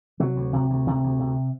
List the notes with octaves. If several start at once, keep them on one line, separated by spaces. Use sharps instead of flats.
C3 F#3
D2
C3
D2
C3
D2
C3